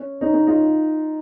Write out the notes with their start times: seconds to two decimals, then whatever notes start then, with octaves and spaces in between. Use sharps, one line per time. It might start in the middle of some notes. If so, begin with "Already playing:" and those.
Already playing: C#4
0.21 C#4 D#4
0.33 C#4 D#4
0.47 D#4 F4